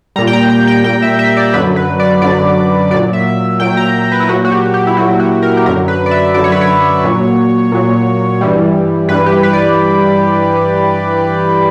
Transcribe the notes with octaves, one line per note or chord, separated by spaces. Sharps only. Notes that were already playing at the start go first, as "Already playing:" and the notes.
A#2 G3 A#5
G5
A#5
A#5
G5
A#2 G3 G5
E5
E5
D5
F#2 D3 F#3 B4
B4
D5
F#2 D3 F#3 D5
A#2 F#3 D5
E5
A#2 F#3 G5
A#5
B4
E4
A#2 F#3 F#4
F#4
G4
G4
E4
A#2 F#3 F#4
F#4
A#4
G4
F#2 D3 F#3 A#4
B4
D5
E5
F#2 D3 F#3 D5
C#5
B4
C#5
A#2 F#3
A#2 F#3
G2 E3 G3
G2 E3 G3 B4
G4
B4
D5